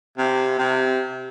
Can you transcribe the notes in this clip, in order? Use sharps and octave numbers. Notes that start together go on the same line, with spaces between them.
C3
C3